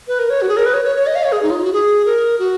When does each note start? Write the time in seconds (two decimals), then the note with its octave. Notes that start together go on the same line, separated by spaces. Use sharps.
0.08 B4
0.19 A#4
0.30 C#5
0.42 F#4
0.49 G#4
0.57 A#4
0.66 B4
0.74 C#5
0.85 C#5
0.96 C#5
1.07 D#5
1.15 F5
1.24 C#5
1.32 G#4
1.43 D#4
1.51 F4
1.63 F#4
1.73 G#4
2.06 A#4
2.39 F#4